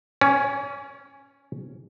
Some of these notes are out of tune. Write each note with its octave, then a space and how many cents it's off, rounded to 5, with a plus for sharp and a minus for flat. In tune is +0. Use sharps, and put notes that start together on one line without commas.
C#4 +0 C#5 +45